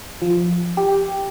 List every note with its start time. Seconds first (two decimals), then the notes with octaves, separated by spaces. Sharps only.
0.22 F3
0.77 G4